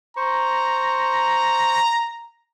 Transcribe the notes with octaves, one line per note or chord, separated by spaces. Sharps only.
C5 A#5 C#6